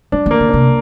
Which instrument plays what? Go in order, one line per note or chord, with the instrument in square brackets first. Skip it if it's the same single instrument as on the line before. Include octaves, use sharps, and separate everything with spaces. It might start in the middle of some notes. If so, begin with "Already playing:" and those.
[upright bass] G3 [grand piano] D4
[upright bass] D#3 [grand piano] A#3
[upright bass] D3
[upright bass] C3 [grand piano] D4